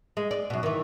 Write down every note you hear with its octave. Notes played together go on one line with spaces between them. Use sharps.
G#3
D5
F#2 B2
D#3 E3